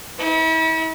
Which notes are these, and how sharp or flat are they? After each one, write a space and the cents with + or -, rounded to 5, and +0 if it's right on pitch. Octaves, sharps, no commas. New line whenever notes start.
E4 -40